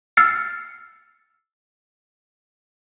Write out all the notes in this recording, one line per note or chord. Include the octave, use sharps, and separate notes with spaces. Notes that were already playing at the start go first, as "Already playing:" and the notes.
E6 F6 A6 C7 C#7